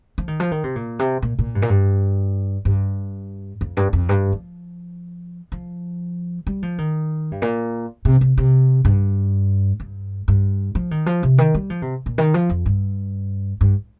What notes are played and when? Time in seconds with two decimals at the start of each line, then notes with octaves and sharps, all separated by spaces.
0.18 F3
0.28 D#3
0.40 F3
0.51 D#3
0.64 C3
0.76 A#2
0.99 C3
1.22 A#2
1.39 A#2
1.55 G2
1.62 A#2
1.70 G2
2.65 G2
3.61 F2
3.77 G2
3.93 F2
4.09 G2
4.33 F3
5.52 F3
6.47 G3
6.63 F3
6.78 D#3
7.32 G2
7.42 A#2
8.05 C3
8.21 C3
8.37 C3
8.85 G2
9.80 G2
10.28 G2
10.75 F3
10.91 D#3
11.06 F3
11.23 C3
11.38 D#3
11.54 G3
11.70 F3
11.82 C3
12.06 A#2
12.18 D#3
12.34 F3
12.49 F2
12.66 G2
13.61 G2